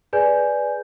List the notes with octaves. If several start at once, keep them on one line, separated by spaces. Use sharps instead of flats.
G#4 B4 D5 G#5 G6